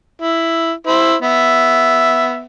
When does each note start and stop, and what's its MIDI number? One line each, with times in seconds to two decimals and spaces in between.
0.21 0.71 64
0.87 1.15 64
0.87 1.15 72
1.22 2.44 59
1.22 2.44 76